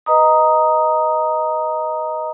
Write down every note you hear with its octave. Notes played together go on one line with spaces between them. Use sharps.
B4 D#5 A#5 D#6